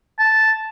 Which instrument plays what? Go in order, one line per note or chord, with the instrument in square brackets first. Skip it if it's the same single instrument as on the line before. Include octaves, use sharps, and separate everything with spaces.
[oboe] A5